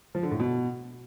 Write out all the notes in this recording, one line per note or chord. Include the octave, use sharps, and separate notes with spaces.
F3
D3
A2
B2